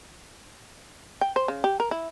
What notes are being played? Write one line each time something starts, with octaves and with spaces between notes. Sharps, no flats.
G5
C5
C#3
G4
A#4
E4